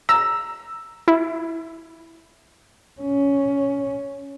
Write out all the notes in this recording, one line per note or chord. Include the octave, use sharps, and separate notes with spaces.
A#5 E6
E4
C#4